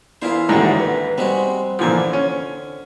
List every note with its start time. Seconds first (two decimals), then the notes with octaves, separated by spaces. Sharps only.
0.22 E2 E4 F4 G#4 A#4 C5
0.49 D#2 G#2 D3 E3 G#3 A3 F#4
0.79 B4
1.18 G3 G#3 C4 F#4
1.79 A#2 D3 E3 F3 G#5
2.13 C#4